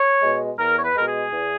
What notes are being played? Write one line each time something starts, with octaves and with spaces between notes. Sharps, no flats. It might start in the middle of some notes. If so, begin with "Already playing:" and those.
Already playing: C#5
B2 G#3
E2 A#4
C#5
B4
B2 G#3 A#4
G#4
E2